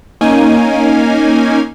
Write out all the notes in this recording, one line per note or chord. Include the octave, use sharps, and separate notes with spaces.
A#3 C#4 D#4 G#5